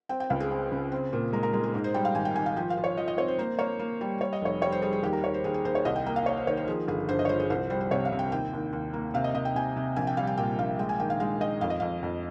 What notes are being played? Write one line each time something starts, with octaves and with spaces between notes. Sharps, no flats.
C4 G5
G5
C#2 F5
G#4
C4
C#3
C4
A#2
G#3 A#4
A#4
G#3 A#4
G#4
G#2 A#4
C5
G3 G5
F5
G#1 G#5
G5
G#1 G#5
F5
F3 G5
F5
F3
C#5
F3 D#5
D#5
C4 C#5
C5
A#3 C5
A#3 C#5
A#3
G3
G3 C#5
D#5
F1 C#5
G3 C#5
C5
G3 G#4
G#4
D#2 G4
A#4
D#2 C#5
C5
D#2 G#4
G#4
D#2 C5
C#5
C2 D#5
G5
A#3 G5
F5
A#3 C#5
C5
D#3 C#5
C5
F3 G#4
G1 G#4
G2 C5
D#5
C#5
F3 C5
G#4
C2 C5
G3 C5
C5
C3 C#5
F5
C3
G5
D#2 G5
D#2
D#2
A#3
C3 F5
D#5
C3 D#5
G5
C3 G#5
C3
A#1 G#5
G5
G3 F5
G5
A#2 G5
A#1 F5
G#3 G5
G#5
D#3 G5
F5
G#3 F5
D#3 D#5
F2 F5
D#5
F2 F5
F2